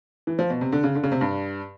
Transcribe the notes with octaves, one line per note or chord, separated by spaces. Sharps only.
E3
F3
B2
C3
D3
C#3
D3
C#3
C3
G2